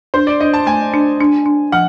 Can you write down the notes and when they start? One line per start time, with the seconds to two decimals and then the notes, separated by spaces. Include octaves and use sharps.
0.14 D4 C5
0.27 D5
0.40 D4 D#5
0.54 A5
0.67 A3 G#5
0.94 D4
1.21 D4
1.46 D4
1.72 F3 F#5